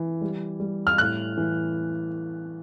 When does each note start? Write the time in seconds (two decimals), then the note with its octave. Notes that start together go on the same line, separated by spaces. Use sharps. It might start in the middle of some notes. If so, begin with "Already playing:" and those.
Already playing: E3
0.21 G3
0.60 G3
0.87 F6
0.98 A2 F#6
1.37 E3